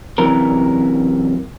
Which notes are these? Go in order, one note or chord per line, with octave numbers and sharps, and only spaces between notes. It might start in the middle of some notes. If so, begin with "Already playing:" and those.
F#2 C3 E3 A#4